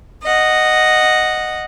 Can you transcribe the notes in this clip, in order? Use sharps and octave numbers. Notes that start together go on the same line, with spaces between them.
D#5 F#5